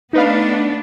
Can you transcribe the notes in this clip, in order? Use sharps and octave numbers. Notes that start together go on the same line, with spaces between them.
A3 B3 D4 D#4 B4 F5